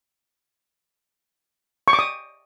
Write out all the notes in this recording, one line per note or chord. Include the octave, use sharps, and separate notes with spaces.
C#6
D6
D#6